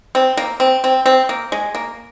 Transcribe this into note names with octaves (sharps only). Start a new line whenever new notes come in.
C4
A#3
C4
C4
C4
A#3
G#3
A#3